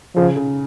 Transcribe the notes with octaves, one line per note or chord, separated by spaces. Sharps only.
C#3 F3
C#3